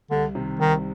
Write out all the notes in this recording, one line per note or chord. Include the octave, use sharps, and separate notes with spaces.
C2 D3
C3 D#3
C2 D#3